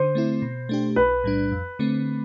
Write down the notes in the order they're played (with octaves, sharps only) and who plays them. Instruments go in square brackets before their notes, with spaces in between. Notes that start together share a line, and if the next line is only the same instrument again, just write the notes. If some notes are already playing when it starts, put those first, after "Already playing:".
Already playing: [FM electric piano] D3 [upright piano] C5
[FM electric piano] A3 C4 E4
B2
A3 D4 G4
[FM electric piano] B1 [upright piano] B4
[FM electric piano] A2 G3 D4
F2
D3 A3 C4